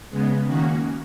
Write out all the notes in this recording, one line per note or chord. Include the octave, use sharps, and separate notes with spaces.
C#3 G#3 B3
D#3 A#3 C#4 F#4